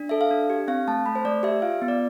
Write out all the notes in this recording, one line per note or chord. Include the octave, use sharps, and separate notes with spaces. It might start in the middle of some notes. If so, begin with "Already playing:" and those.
Already playing: D4
A4 E5
F5
D4
G4
C4 F5
A3 A5
A3 B5
C5
A3 D5
G4 E5
F4 F5
B3
D5